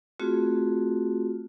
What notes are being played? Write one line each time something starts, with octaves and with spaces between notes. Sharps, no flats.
A3 C4 F4 F#4 G#4